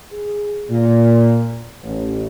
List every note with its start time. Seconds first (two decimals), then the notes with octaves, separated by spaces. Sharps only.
0.11 G#4
0.69 A#2
1.82 A1